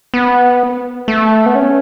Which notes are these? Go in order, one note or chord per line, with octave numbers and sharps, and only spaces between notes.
B3
A3
B3
C#4